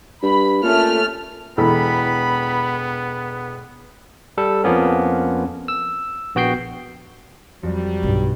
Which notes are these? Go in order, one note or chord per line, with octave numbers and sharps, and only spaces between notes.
G2 B5
A#2 A3 C#4 F6
E1 E3 B3 A4 B5
G3 A4
F2 F3 A#3 B3 C#4
E6
A#1 B3 F#4 G5 G6 C7
F2 F#3 G3
B1 G2